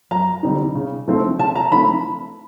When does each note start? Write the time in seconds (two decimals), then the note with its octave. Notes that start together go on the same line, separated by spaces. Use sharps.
0.11 F#2 A#5
0.43 D3 G3 C4 D#4
0.75 C#3
1.08 F3 A3 C4 D#4
1.39 C#3 A5
1.55 A#5
1.72 F3 A3 C4 D#4 B5